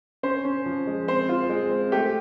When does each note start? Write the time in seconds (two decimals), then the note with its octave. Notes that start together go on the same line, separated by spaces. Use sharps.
0.23 C#4 C5
0.45 C#4
0.66 F3
0.87 G#3
1.08 C4 C5
1.29 F4
1.49 G#3
1.71 C4
1.92 A3 G4